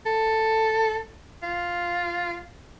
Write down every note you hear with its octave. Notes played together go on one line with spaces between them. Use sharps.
A4
F4